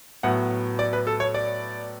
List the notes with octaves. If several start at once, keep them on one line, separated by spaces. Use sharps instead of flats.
A2 F#3 B3 F#5
D5
B4
A4
C#5
D5